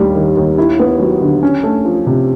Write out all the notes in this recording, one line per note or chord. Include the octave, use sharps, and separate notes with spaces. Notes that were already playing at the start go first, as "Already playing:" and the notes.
Already playing: D#2 G3
D#3
D#2
E4
B3
F#3
D3
C#4
A3
F3
C3